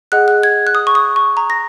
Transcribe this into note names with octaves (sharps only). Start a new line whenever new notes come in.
G#4 D#5 F#5 F#6
F#6
G#6
F#6
D#6
C#6
D#6
C#6
A#5
A#6